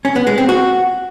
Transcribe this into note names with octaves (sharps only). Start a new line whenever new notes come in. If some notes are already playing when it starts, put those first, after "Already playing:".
C#4
B3
G#3
C4
F#4